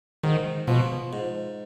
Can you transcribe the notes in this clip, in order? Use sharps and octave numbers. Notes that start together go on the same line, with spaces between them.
G#2 D#3
B2 F3
G#2